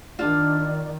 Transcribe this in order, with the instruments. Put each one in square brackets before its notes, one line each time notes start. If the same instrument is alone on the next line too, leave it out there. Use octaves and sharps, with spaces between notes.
[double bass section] D#3 [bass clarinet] D4 [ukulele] F4 [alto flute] D5